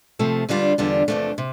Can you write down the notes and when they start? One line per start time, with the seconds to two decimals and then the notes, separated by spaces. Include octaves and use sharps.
0.19 C3 F3 A3
0.49 E2 D3 G3 D4 F4
0.78 E2 D3 G3 D4 F4
1.08 E2 C3 F3 A3 D4
1.38 C3